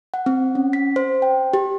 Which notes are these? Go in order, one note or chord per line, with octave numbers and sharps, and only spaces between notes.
F#5
C4
C#4
B6
C5
G5
G4